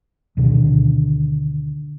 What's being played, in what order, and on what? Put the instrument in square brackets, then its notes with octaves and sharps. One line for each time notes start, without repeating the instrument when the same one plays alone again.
[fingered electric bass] D2 B2 D3 D#3